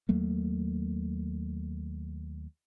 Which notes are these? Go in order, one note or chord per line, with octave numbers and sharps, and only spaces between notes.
D#2 F#3 A3 A#3